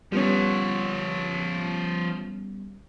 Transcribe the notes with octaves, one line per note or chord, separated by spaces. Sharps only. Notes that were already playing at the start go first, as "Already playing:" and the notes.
F3 G3 B3 C#4 C#5